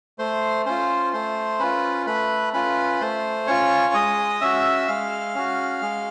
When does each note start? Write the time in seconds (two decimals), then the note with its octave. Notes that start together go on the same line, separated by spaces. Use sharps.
0.19 A3 C5 C6
0.66 C#4 F4 C5 C6
1.13 A3 C5 C6
1.59 C#4 F4 B4 B5
2.07 A3 B4 B5
2.53 C#4 F4 B4 B5
3.00 A3 C5 C6
3.47 C#4 F4 C#5 C#6
3.94 G#3 D#5 D#6
4.41 C#4 F#4 E5 E6
4.88 G#3 F5 F6
5.35 C#4 F#4
5.82 G#3